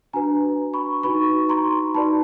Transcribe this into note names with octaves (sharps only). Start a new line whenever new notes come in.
D4 F#4 B4 G#5 A#5
B5 C#6
D#4 F#4 B4 B5 C#6
A#5 C6
D#4 F#4 B4 D5 A5 B5